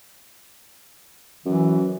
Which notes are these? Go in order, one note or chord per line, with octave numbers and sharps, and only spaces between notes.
F#2 E3